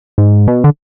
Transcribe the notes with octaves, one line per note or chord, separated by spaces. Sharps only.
G#2
B2
D3